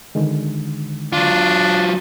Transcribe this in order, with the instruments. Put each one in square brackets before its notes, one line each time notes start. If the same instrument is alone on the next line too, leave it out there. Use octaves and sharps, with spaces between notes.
[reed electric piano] D3 D#3 G#3
[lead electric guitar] F#3 F4 [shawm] D4